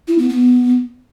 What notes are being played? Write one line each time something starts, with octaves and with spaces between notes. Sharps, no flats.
E4
B3
B3